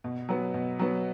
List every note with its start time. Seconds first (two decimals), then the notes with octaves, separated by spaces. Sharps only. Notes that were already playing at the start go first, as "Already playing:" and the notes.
0.04 B2
0.29 F#3 B3
0.54 B2
0.79 F#3 B3